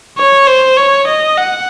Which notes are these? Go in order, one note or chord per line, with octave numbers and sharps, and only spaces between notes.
C#5
C5
C#5
D#5
F#5